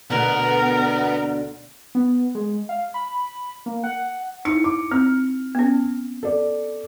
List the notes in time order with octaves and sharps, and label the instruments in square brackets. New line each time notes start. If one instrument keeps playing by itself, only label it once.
[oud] D2 B2 D3 [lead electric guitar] B3 [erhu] A#4
[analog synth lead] B3
G#3
F5
B5
A#3
F#5
[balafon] D#4 E4 [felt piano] C#7
[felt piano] D6
[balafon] C4 [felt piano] F6
[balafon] B3 C#4
[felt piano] A4 D5